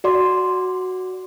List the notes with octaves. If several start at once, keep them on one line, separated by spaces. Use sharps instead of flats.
F#4 D5 C6